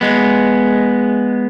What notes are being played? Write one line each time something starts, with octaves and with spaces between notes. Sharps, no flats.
G#3 B3